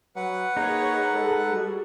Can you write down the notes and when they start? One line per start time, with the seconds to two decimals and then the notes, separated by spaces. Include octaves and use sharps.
0.16 F#3 B4 F#5
0.57 A#3 D#4 G#4 C#5
1.13 G#3 A4
1.53 G3 F#4 G#4